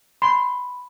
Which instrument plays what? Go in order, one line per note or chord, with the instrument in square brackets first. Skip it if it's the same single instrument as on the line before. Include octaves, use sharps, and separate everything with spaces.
[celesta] B5 [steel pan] C6